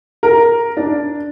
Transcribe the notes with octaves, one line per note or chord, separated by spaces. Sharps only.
A#4
D4